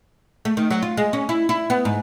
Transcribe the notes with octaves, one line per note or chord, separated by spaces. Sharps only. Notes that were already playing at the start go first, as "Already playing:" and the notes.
A3
D#3
F#3
F4
G#3
C#4
E4
E4
B3
G#2